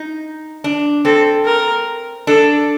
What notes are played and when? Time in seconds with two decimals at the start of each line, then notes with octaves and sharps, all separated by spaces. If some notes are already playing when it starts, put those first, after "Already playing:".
Already playing: D#4
0.64 D4
1.05 C4 A4
1.45 A#4
2.27 D4 A4